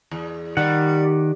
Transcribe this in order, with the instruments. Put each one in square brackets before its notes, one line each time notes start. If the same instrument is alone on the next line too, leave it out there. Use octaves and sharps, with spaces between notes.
[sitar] E2
[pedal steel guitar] D#3 F#5 [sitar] G3